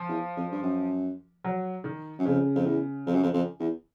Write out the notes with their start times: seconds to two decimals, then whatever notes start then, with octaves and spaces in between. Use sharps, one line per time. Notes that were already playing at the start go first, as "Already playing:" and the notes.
Already playing: F3
0.08 E2
0.36 F2
0.51 G2
0.62 F#2
1.44 F#3
1.84 D#3
2.19 F#2
2.25 F2 C#3
2.55 F2
2.66 E2
3.07 F2
3.14 F#2
3.23 F2
3.33 F2
3.60 E2